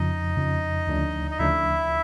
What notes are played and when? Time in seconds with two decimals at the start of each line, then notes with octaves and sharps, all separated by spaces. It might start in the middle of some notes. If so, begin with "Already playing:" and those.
Already playing: F2 C#3 F3 D#4 D#5
0.37 F2 C#3 F3
0.87 D2 C#3 F3 A3 D4
1.31 D#5
1.39 D2 C#3 F3 A3 D4 E4 E5